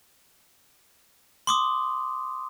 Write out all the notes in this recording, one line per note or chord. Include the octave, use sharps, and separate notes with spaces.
C6 D6 D#6